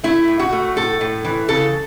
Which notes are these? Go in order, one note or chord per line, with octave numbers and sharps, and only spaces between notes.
A3 E4
A2
F#4
A3
A2 A4
A2
E3
C#3 A4